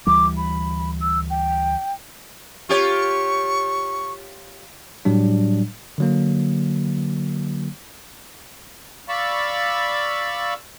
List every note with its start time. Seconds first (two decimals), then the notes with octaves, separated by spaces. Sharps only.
0.07 D2 E3 G3 D6
0.37 B5
1.01 E6
1.30 G5
2.69 F4 G4 C#5 C#6
5.05 A2 F#3 G3 D4
5.98 D3 F#3 A#3
9.09 D5 F5 B5 C#6 E6